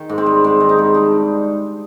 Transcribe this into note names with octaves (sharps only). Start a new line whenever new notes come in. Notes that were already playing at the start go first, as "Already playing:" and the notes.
Already playing: D#3
G#2
C4
G3
G#2 C4
D#3
D#4
G#2
G3 D4